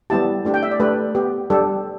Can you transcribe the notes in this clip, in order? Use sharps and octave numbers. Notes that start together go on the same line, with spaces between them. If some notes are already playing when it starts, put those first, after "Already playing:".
G3 B3 E4 G4 A5
A3 D4 G4
G5
E5
D5
A3 D4 G4 B4
B3 G4
G3 D4 G4 A4